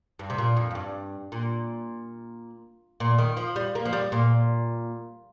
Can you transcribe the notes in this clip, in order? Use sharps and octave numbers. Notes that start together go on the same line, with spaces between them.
G2
C3
A#2
F2
F2
G2
A#2
A#2
D#3
F3
G3
A#3
F3
G3
A#2